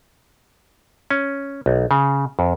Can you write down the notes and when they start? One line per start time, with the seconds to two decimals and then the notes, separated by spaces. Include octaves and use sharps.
1.10 C#4
1.66 B1
1.91 C#3
2.39 F2